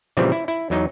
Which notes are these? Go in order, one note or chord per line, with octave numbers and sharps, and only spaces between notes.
A#2 C#3 E3 F3 G3 C4
E4
E4
E2 F#3 D#4